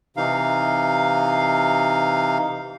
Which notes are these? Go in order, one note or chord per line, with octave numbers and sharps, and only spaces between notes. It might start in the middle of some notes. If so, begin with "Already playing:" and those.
C3 E3 D#4 F5